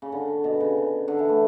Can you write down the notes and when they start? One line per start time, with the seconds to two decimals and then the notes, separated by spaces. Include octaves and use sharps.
0.02 C#3
0.12 D3
0.44 B2
0.60 C#3
1.08 D3
1.19 E3
1.29 A3